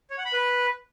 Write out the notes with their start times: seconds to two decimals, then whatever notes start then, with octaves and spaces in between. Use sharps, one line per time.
0.10 C#5
0.18 F#5
0.26 B5
0.33 B4